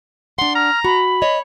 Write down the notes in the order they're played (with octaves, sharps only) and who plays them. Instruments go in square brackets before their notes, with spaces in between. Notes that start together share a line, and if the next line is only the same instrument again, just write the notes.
[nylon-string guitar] D4 F#5 [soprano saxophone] C6
[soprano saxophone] A#5 [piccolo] F6
[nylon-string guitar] F#4 [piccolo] B5
[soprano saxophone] C#5 [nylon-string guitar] D#5